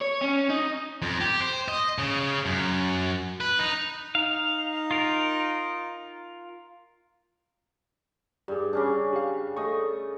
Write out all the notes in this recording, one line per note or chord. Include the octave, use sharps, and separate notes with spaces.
C#5
C#4
D#4
F2
G4
C5
D#5
C#3
F#2
B4
D#4
D#4 F5
F4 A#4
G2 G4 G#4
C#3 C#4 D4
G4 F5
A3 D#5 C#6